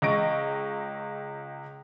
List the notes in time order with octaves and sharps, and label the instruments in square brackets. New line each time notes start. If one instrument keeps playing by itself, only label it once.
[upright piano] C#2 D#5 C#6 A#6 D7